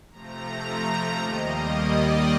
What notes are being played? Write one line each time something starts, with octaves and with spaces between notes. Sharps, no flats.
C3 F3 A3 A#5
D#2 D#3 G3 A#3 D#5
D5